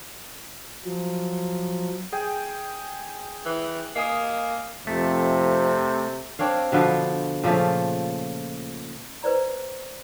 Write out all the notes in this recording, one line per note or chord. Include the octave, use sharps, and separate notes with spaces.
F3 F#3
G#4 G5
E3
A#3 D#5 G#5 D#6
F2 C3 A3
C4 D4 C#5 F5
B2 D3 F3 B3
A#2 C#3 F3 A3
B4 C5 D5 A#5